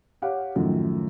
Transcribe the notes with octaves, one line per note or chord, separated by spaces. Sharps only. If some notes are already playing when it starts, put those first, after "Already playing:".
G4 C#5 F5 F#5
F#2 A2 D#3 F3